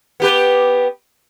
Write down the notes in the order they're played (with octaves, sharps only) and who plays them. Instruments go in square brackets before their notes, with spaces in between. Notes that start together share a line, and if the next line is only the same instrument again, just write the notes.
[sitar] B3 G4 B4